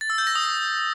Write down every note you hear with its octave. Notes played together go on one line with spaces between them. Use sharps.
A6
E6
G6
A#6
D#6